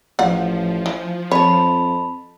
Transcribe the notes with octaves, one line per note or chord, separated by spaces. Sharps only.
A1 F3 F4 F#5
E3
F2 C#5 A5 B5